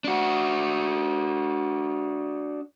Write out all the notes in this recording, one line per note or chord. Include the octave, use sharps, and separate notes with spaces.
D4 F#4